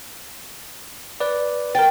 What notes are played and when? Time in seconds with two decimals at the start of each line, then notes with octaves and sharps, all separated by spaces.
1.20 B4 D5
1.75 A#4 G5 A6